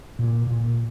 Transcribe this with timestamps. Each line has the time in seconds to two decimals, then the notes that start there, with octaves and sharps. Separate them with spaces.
0.19 A#2
0.47 A#2